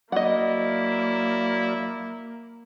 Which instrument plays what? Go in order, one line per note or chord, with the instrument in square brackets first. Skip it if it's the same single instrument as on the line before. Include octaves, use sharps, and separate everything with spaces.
[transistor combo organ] F#3 D5 [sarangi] A#3 [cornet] E4 [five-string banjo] D#5 F#5